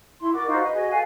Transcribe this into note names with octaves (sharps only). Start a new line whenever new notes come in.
E4 C6
F#4 A#4 D5 D6
D#4 F4 F#4 C5
B4 D#5
F#4 G#4 D#5
A4 B4 F5 G#5